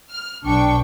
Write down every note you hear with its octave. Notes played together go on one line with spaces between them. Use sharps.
F6
B1 D4 G5 C#6